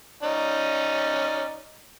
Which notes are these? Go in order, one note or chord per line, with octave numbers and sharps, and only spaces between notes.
C#4 D#4 D5